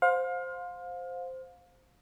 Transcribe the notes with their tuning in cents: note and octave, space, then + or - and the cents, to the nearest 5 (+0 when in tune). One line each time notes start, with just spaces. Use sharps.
C5 +0 F5 +30